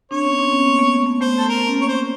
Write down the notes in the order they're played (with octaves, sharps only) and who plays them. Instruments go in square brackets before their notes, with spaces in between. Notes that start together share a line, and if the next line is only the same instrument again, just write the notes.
[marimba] C4 D4 [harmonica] C#5
[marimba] B3 C#4
C4 D4
B3 C#4
A#3 C4
A3 B3
A3 B3
[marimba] A3 B3 [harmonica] C5
[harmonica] A4
A#4
[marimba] C#4
A#3 C4
[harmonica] C#5
C5